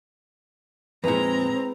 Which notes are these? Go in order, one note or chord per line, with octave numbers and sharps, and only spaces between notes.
F2 A#2 G#3 C4 E4 G#4 B4 A#5